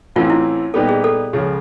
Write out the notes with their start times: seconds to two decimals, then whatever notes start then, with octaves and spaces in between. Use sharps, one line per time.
0.16 A1 A2 E3 A3 C4 F4
0.30 E4
0.74 A#2 G3 B3 D#4 G4 A4
0.89 G#4
1.04 A4
1.33 C#2 C#3 F3